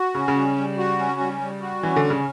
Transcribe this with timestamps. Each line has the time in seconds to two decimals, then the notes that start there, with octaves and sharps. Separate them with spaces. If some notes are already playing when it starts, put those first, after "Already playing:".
Already playing: F#4
0.14 C#3 C#4
0.28 C#3
0.36 G3
0.57 G3
0.78 F#4
0.99 C#4
1.20 G3
1.41 G3
1.61 F#4
1.82 E3 C#4
1.96 D3
2.04 G3
2.10 C#3